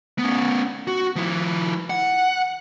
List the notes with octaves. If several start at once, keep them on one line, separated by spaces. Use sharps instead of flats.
B3 C#4
F#4
F3 E4
F#5